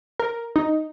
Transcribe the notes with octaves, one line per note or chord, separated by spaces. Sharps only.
A#4
D#4